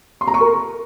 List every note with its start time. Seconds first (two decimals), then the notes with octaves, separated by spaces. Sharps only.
0.21 C6
0.28 A#5
0.34 C#6
0.41 A#4